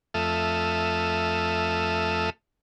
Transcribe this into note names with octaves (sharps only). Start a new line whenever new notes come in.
F2 A3 A4 E5 D#6 F6